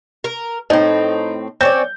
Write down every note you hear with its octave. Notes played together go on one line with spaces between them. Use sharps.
A#4
A2 C4 D#4
C4 C#4 D5 G6